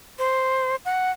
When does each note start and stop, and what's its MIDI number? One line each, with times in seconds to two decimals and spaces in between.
0.19 0.76 72
0.85 1.11 78